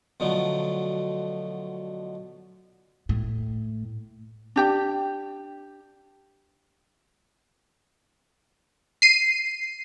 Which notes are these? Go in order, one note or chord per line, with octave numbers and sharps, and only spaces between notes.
B2 D3 F3 F#3 A3
A2
D4 G4 G5
C7 D#7